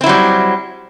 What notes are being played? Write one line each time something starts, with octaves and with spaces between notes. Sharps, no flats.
F#3 G3 C4 E4